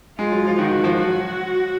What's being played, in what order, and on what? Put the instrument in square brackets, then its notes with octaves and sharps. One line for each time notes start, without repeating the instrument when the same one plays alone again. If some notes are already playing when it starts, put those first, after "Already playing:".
[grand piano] G#3 [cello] F4
[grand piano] F#3
F3
[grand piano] D#3 [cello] F#4
[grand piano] D#3
F3
[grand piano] F#3 [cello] F#4
[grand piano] F#3